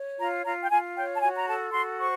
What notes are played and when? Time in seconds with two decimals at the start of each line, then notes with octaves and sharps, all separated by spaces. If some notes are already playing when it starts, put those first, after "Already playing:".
Already playing: C#5
0.19 F4 A#5
0.45 F4 A#5
0.63 G5
0.70 F4 G#5
0.96 C#5 G5
1.16 A5
1.21 F#4 G#5
1.36 A#5
1.47 A4 A5
1.72 F#4 C6
1.98 C5 C#6